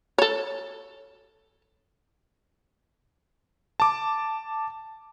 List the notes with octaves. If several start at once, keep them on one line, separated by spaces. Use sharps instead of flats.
A4 C#5
A5 D6